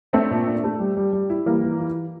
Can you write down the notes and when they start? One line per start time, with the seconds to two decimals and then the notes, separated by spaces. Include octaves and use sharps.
0.13 A3 C4 D4
0.31 A#2
0.46 D4
0.64 A3
0.79 G3
0.97 G3
1.13 G3
1.30 E4
1.46 E3 G3 A#3
1.63 E3
1.80 E3